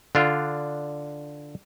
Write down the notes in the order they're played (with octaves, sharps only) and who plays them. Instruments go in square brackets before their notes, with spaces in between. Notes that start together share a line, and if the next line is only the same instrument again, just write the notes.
[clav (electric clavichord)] D3 D4 F4